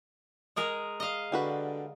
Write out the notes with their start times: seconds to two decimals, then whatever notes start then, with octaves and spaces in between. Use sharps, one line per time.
0.56 G#3 G#4 A#4
1.00 D#5 F5
1.32 D3 G3 F#4 B4